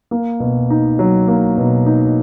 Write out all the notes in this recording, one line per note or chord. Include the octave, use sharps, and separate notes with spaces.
A#3
B2
D#4
F#3
A#3
B2
D#4